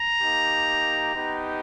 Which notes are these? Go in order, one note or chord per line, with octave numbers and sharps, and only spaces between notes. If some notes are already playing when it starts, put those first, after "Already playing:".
Already playing: A#5
A#3 D#4 G4
B3 D#4 G4